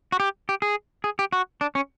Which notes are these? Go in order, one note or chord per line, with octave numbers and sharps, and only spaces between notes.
F#4
G4
G4
G#4
G#4
G4
F#4
D4
C#4